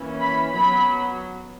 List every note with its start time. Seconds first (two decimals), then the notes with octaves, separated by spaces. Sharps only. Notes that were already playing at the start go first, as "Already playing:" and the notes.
Already playing: E3 A#3 C#4
0.22 B5
0.54 F#3 B3 B5